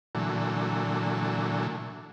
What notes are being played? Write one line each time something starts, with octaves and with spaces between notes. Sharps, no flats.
A#2 D3 E3 F#3 A3